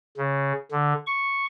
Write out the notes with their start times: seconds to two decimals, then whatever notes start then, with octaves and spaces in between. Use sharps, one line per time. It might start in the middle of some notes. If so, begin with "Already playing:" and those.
0.17 C#3
0.71 D3
1.06 C#6